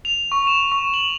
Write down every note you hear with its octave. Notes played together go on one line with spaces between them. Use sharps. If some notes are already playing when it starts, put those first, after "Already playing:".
F7
C#6
E7
C#6
F#7